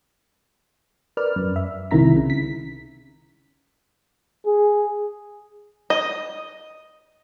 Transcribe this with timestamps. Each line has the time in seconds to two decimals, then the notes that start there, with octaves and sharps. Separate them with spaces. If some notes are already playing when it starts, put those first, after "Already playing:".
1.17 A#4 B4 D5 F6
1.36 F#2
1.56 E5
1.91 C2 C3 D#3 E4 A#5 B6
2.16 C#3
2.30 B6
4.46 G#4
5.90 D#5